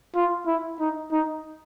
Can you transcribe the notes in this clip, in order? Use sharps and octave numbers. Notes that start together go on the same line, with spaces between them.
F4
E4
D#4
D#4